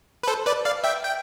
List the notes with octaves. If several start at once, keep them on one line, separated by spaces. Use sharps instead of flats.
B4
A4 C5
B4 D5
D5 F5
E5 G5
G5